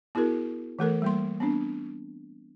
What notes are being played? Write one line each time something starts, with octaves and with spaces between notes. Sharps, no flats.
B3 E4 F#4 G#4 A#4
E3 A3 A4 A#4
G3 A#3 C6
B3 C4 D4